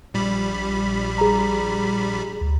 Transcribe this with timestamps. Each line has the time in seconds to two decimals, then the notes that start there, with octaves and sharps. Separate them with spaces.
0.14 A#1 G3 B5
1.18 G#4 A#5
2.41 D2